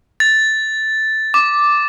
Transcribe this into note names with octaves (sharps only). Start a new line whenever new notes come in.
A6
D6